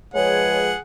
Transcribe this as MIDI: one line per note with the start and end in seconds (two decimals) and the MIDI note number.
0.14 0.72 53
0.14 0.72 56
0.14 0.77 68
0.14 0.72 71
0.14 0.58 73
0.14 0.77 78